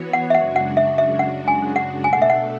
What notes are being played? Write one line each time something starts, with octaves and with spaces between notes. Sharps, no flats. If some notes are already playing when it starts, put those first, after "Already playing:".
Already playing: E3 B3 F#4 C#5
F#5
E5
F#2 C#3 G#3 D4 F#4 F#5
F#5
E5
E5
F#5
G#5
F#5
B2 A3 D4 A4 G#5
F#5
E5
F#5